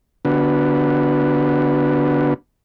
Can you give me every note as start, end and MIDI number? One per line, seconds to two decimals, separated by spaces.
0.25 2.34 50
0.25 2.34 59
0.25 2.34 62
0.25 2.34 66
0.25 2.34 71